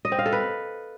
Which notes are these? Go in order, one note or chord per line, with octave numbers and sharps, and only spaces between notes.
D#5
C4
F5
A4
B4